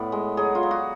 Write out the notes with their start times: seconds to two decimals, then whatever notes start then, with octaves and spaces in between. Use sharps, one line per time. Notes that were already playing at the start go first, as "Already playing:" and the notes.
Already playing: A2 B3 D5
0.12 G#3
0.37 F#3 G#4
0.55 F4
0.63 F#3
0.71 F#4